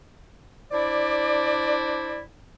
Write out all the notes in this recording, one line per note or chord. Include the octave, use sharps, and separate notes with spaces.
D4 E4 C5 D5